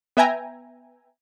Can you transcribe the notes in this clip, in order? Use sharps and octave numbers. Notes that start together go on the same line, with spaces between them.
B3 B4 E5 G5 G#5 A#5